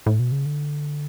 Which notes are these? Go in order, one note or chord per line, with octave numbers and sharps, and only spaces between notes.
A2
B2
C#3
D3